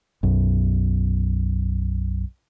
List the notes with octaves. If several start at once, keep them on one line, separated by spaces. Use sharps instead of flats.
B1 F#2